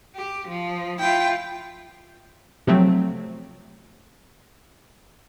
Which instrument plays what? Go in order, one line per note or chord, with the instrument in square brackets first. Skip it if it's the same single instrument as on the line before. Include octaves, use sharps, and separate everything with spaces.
[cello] G4
F3
[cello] E4 F4 [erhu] G5
[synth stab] C3 F3 F#3 A3 C4